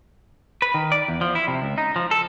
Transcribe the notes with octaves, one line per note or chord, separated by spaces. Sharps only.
B4
D#3
D5
E2
F3
E4
C3
C#2
D#4
F3
A4